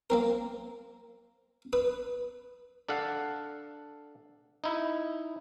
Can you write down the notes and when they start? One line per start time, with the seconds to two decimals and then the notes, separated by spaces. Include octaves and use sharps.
0.10 A#3 C4 A#4
1.73 B4 D#6
2.88 D4 A4 F5 F#5
4.64 D#4 E4